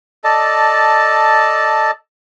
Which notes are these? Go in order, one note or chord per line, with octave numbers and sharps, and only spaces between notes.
A4 D5 D#5 A5